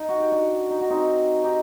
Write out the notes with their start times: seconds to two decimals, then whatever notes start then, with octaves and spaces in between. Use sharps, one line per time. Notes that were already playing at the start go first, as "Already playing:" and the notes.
Already playing: D#4
0.09 F#4
0.20 G4
0.31 D4 F#4
0.70 D#4
0.81 F#4
0.90 C4 D#4
1.44 D#4 G4